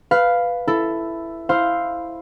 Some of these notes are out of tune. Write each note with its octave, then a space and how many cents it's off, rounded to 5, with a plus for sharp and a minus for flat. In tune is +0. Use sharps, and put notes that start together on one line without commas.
B4 +5 F5 +0
E4 +10 A4 +0
E4 +0 C5 +0 F5 +0